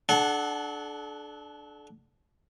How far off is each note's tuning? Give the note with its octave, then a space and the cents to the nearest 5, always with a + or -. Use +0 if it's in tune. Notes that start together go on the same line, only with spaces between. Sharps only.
D4 +10 A4 -35 F#5 +5